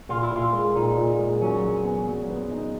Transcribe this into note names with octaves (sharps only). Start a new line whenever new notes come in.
A#2 F4
E4
A#2 F4
G#3
A#2 D#4
A#2
G#3
F#3 C#4
F#3
B3
F#3
B3
D#4